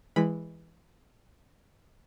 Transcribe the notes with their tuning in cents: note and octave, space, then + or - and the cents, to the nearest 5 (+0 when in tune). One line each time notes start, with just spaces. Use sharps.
E3 +0 G#3 -15 B5 +0